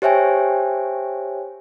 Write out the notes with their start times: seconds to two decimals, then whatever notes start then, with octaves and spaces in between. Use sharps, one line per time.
0.02 G4 C5 C#5 E5 G5 G#5